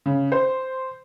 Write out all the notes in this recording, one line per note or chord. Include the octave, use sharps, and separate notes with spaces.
C#3
C5